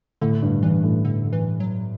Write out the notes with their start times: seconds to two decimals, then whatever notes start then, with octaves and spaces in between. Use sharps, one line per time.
0.21 A2 D3
0.42 G2
0.63 G2 E3
0.84 A2
1.05 D3
1.33 E3
1.60 F#3